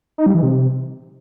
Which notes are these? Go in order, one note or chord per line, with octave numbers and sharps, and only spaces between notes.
D#4
G3
E3
C3